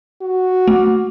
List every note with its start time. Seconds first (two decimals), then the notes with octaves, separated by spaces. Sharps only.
0.22 F#4
0.68 A3